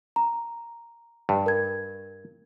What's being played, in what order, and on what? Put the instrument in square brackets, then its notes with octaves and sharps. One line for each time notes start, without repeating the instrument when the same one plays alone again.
[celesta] A#5
[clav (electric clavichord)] G2
[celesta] A#4 G#6